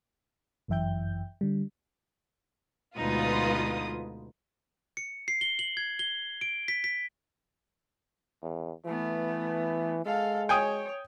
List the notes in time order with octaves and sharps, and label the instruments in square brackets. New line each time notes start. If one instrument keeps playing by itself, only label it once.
[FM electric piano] G1 F#2 E3 E5 G5 G6
D3 G3
[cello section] D2 G#3 [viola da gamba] B2 D#4 [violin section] F4 B4 D#6
[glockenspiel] C#7
C7
G7
F#7
G#6
G7
D7
B6
B6
[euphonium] E2
[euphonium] E3 [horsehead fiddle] A3 B3
[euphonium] G#3 [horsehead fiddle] A4 F5
[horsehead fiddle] C#5 [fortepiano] G5 G#5 D#6